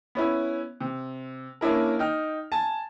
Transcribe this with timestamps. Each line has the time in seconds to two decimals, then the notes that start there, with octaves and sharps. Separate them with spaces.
0.15 B3 C#4 E4
0.81 C3
1.61 A#3 C#4 D4 E4 A#4
1.99 D#4 G5 F6
2.52 G#5 A5